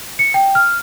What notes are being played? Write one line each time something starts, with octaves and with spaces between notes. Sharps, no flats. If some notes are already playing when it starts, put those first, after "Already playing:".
C#7
G5
F6